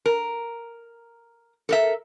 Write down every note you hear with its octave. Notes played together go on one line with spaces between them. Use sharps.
A#4
A4 A#4 E5